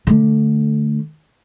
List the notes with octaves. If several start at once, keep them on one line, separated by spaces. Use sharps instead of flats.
D3 A3